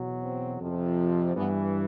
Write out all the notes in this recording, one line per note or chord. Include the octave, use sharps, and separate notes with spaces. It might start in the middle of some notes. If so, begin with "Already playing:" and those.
Already playing: E2 B2 F#3
C4
F2 C3 F3
G2 E3 B3